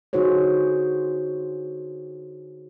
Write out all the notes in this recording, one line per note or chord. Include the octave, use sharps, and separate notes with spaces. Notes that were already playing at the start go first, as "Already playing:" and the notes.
D3 D#4 F#4 G#4 C5 C#5